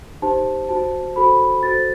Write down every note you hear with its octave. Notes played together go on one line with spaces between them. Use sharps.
D#4 G4 C5 A5
F#4 C5 A5
F#4 A4 C5 B5
F#4 A4 C5 A6